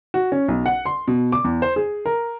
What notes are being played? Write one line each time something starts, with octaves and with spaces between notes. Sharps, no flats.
F#4
C#4
B1
F#5
C6
B2
D6
E2
C5
G#4
A#4